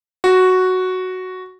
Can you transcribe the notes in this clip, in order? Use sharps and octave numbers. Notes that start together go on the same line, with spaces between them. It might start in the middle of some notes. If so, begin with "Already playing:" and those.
F#4